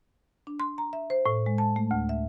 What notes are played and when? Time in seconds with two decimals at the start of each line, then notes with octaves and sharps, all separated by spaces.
0.47 D4
0.60 C6
0.78 A#5
0.93 E5
1.10 C5
1.26 A2
1.46 G#3
1.58 A5
1.76 A3
1.91 D2
2.09 E5